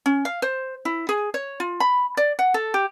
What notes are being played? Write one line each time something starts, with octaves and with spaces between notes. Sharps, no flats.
C#4
F5
C5
E4
G#4
C#5
F4
B5
D5
F#5
A4
G4